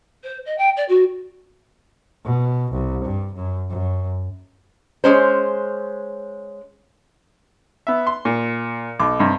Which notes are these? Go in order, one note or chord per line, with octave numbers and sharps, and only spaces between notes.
C5
D#5
G5
D5
F#4
B2
C2
G2
F#2
F#2
G#3 C#4 C5
B3 E5
C6
A#2
B1 D6
G2 C3